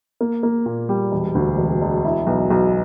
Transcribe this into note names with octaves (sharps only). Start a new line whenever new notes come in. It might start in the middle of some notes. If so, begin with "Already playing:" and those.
A#3
A#3
A#2
G3
E1
D2
E1
E1
E4
B1
B1